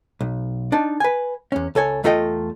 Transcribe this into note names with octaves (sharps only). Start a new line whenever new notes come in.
B1
D4 D#4 A5
B4 G#5
E2 C#4
C#2 A4 C#5 G#5
E2 A3 F4 A4 D#5 G5